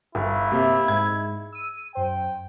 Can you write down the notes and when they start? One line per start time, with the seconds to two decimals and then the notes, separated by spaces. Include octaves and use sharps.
0.15 G1 E4
0.52 C3 A#3 F5
0.88 G#2 G#3 G#6
1.52 E6 D#7
1.95 F#2 C5 G5